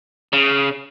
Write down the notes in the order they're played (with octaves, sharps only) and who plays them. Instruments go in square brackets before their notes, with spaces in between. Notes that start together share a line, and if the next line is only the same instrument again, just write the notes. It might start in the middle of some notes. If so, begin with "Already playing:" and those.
[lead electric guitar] C#3